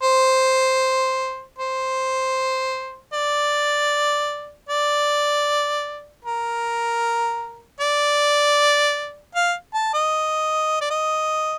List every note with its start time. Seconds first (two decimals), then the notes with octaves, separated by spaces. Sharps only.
0.03 C5
1.58 C5
3.13 D5
4.69 D5
6.25 A#4
7.81 D5
9.35 F5
9.74 A5
9.94 D#5
10.81 D5
10.90 D#5